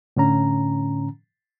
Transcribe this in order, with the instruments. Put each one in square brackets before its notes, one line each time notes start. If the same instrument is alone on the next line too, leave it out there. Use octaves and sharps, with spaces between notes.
[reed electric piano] A2 D3 C#4 A#5